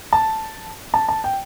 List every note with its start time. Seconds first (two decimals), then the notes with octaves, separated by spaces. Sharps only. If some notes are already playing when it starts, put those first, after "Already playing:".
0.13 A5
0.94 A5
1.09 A5
1.24 G5